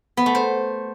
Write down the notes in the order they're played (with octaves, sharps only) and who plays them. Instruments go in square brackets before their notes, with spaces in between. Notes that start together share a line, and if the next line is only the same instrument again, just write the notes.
[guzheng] B3
A3
C5